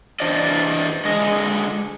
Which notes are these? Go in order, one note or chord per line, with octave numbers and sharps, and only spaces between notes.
E3 D4 C5 D5 D#5
D3 G#3 D#5